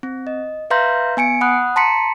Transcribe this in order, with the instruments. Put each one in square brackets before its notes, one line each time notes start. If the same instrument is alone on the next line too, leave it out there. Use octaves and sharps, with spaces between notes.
[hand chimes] C4
D#5
B4 E5 F5 A#5 C6 G6
B3 G#5 C#7 D7
F#5 B5 D#6 F#6
A5 A#5 C6 B6 C#7